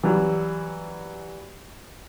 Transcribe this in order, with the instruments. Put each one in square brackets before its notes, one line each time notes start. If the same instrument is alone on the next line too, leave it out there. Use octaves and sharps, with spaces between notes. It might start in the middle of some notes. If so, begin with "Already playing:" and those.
[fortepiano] E3 F#3 G3